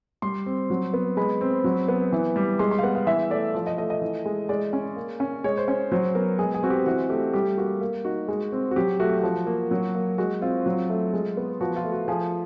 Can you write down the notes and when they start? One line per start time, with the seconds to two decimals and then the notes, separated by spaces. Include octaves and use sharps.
0.22 G3 C6
0.46 C4
0.70 F#3
0.94 B3
1.17 G#3 B5
1.41 C4
1.64 F#3
1.88 B3
2.12 E3
2.36 G3
2.59 G#3 C6
2.71 C6
2.79 F5
2.83 B3 F#5
2.95 F5
3.07 E3 E5
3.30 A3 D5
3.54 F3
3.67 D#5
3.78 A3 D#5
3.90 D#5
4.01 E3
4.25 G#3
4.49 G#3 D5
4.73 C#4
4.96 A#3
5.20 C#4
5.44 G#3 C#5
5.57 C5
5.68 C#4 C#5
5.92 F#3 C5
6.15 B3 A#4
6.39 G#3 G#4
6.54 G#4
6.63 C4 F#4
6.70 G4
6.86 E3 F#4
7.10 A3 G4
7.33 G3 G4
7.58 A#3 F#4
7.81 A#3
8.05 D#4 F#4
8.28 G#3
8.52 C4
8.71 F#4
8.76 F#3 G4
9.00 A3 F#4
9.09 G4
9.19 F3 F#4
9.47 A#3
9.71 F#3
9.95 A#3
10.18 G#3 F#4
10.42 C4 F4
10.66 F#3
10.90 A3
11.13 G#3
11.37 B3
11.61 F3 F#4
11.76 F4
11.84 A3
11.92 F#4
12.08 F3 G#4